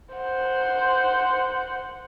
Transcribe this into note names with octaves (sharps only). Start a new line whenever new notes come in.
C5 F#5